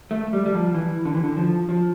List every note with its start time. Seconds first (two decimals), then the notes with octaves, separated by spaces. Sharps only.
0.11 A3
0.33 G3
0.46 G3
0.54 F3
0.75 E3
1.05 D3
1.15 E3
1.24 D3
1.37 F3
1.69 F3